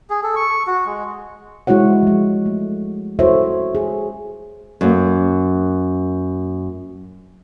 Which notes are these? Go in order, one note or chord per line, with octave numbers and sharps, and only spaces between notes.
G#4
A4
C#6
F#4
G#3
G#3 E4 F#4 C#5 F#5
F3 G#3
A3
E4 F#4 A4 C5 C#5 E5
G#4
F#2 A#3